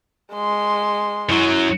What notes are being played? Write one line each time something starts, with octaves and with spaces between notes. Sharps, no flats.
G#3 C6
F#2 F#3 E4